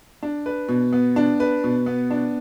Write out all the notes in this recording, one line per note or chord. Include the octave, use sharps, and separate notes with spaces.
D4
B4
B2
B3
D4
B4
B2
B3
D4